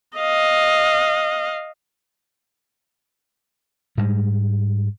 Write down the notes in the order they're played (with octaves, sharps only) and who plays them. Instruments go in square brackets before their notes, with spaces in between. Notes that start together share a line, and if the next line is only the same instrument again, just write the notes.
[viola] D#5 F5
[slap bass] G#2 G3 G#3